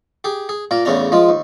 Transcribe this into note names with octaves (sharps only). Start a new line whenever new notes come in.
G4 G#4
G#4
A#2 A#3 A#4
A1 E2 C#3 C#4 D4 A#5
F3 G#3 F4
D#2